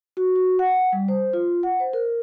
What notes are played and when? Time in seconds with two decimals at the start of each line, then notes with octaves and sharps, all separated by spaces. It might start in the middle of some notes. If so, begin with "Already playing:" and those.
0.17 F#4
0.36 F#4
0.59 F#5
0.93 G3
1.08 C5
1.33 F4
1.63 F#5
1.80 C5
1.93 A#4